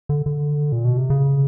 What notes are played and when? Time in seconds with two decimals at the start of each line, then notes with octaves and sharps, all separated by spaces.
0.09 D3
0.26 D3
0.72 A#2
0.85 B2
0.97 C3
1.10 C#3